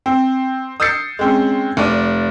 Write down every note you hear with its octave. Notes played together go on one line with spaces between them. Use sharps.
C4
D#6 E6 G6 A6 C7 C#7
G#3 C4 C#4
F1 D5 D#7